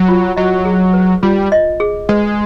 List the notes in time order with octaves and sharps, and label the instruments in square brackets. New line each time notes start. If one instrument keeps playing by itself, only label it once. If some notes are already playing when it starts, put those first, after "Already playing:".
Already playing: [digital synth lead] F#3
[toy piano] F4
[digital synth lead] F#3 [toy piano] D#5
[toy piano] G#4
B4
[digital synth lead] G3 [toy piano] F4
[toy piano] D#5
G#4
[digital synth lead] G#3 [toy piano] B4